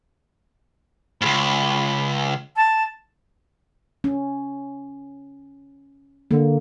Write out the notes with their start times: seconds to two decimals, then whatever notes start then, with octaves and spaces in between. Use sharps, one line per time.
1.21 C#2 G#2 B5
2.56 A5
4.04 C#4
6.31 D3 A#3